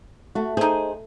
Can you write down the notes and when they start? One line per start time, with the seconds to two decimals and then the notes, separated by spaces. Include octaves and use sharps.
0.35 A3 F#4
0.57 D#4 G#4 C5